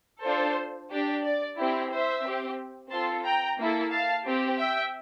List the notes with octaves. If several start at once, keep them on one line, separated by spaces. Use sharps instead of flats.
D4 F4 A4 C5
D4 G4
D5
C4 E4 G4
C5 E5
C4 G4
C4 F4 A4 A5 C6
G5 A#5
A#3 E4 A4
F5 A5
C4 G4
E5 G5